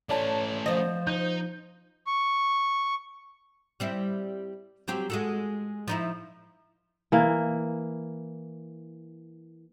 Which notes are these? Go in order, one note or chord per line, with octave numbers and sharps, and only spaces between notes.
A3 C#4 C#5 D5 A5
F3 C5 D#5
D#4 G6
C#6
G3 C4 E4
F#3 C4 G4
G#3 F#4 A4
F3 D#4 E4
E3 A#3